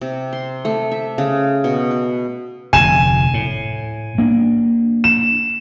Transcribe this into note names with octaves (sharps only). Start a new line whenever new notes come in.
C3
C6
A3
E5
C#3
B2
B4
F1 D2 G#5 E7
A2
A#3 D4
E7